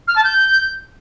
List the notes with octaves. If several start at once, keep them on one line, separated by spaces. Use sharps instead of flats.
F6
A5
G6